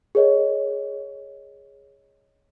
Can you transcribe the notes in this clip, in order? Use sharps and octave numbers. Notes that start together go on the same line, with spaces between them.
G#4 A#4 C#5 D#5